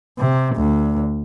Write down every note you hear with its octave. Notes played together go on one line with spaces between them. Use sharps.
C3
D2